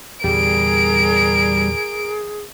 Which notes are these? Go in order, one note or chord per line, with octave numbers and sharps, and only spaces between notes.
E2 A#2 D3 G3 G#4 A#4 D7